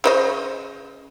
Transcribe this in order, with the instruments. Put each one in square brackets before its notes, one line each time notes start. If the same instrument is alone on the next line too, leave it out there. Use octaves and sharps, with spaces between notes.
[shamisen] C#3 C5 D#5